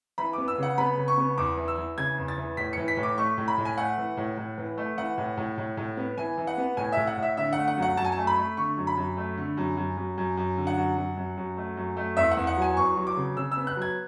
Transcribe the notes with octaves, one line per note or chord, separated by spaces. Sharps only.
E3 B5
B3 D6
E6
C#3 F#5
B3 B5
C#3
C#6
B3
E2 D6
E3
E6
E3
C#3 G#6
E2
A6
E3
A2 B6
E3 C#7
B6
A2
D6
A3 C#6
A2
B5
A2
G#5
A3 F#5
E3
A2
A2
E3
A3
E3 F#5
A2
A2
A2
A2
B3
E3 G#5
E3
F#5
B3
A2 G#5
A2 E5
F#5
A2 E5
D3 E5
A3 F#5
F#5
F#2
F#5
F#2 A5
G#5
A5
A3
B5
A3
D3 C#6
F#2
B5
F#2
A3
D3
F#2
F#2
F#2
F#2
F#2
D3
F#5
F#2
F#2
F#2
F#2
A3
F#2
A3
E2 E5
F#5
E2
F#5
F#3 G#5
E2 C#6
F#3
D6
C#3
C#3 E6
E6
B3
F#6
F#3
G#6